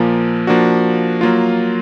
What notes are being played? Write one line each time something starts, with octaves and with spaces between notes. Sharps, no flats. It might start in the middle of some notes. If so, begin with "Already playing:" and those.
Already playing: A#2 F3 A#3
F3 A#3 D4 F#4
F#3 A#3 F4